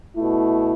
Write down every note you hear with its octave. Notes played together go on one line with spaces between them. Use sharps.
B2 A3 E4